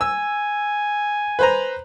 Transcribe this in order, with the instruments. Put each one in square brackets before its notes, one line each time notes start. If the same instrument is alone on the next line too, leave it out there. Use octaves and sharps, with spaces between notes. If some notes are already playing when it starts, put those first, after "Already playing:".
[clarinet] G#5 [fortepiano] E6
[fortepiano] B4 C5 A#5